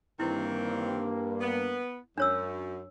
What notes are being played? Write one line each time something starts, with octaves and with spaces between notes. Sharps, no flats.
G2 D#3 E3 A#3 C4 E4
B3
F#2 D4 C#5 E6